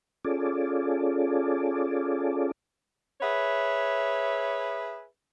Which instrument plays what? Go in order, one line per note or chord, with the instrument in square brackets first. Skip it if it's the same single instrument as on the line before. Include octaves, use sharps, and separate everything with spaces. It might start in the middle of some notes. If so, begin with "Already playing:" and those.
[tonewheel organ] C#4 F4 G#4 A4 D5
[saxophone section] G#4 B4 C#5 E5